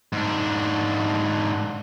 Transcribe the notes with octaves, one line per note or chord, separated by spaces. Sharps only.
G#2 D4